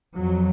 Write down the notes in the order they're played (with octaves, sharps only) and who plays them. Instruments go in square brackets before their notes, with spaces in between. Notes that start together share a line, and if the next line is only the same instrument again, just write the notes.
[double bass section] F2 F#3